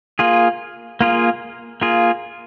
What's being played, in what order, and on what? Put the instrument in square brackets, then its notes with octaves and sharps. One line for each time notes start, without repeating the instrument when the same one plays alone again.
[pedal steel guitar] A#3 F4 G#4
A#3 F4 G#4
A#3 F4 G#4